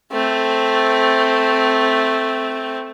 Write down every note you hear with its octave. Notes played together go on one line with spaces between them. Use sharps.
A3 C4